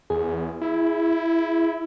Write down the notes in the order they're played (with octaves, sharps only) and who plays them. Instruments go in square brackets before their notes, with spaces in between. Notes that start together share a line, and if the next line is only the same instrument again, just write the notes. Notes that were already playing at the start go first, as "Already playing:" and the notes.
[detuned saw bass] E2 [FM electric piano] G#4
[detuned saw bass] E4